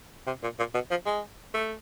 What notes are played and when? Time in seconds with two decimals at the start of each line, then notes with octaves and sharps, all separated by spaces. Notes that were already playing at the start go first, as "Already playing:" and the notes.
0.26 C3
0.43 A#2
0.58 A#2
0.74 B2
0.90 F3
1.06 G#3
1.54 A3